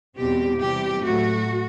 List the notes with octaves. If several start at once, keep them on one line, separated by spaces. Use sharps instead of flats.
E2 B2 G3 C4 G4
C3 E3 G3 G4
A2 F#3 A3 F#4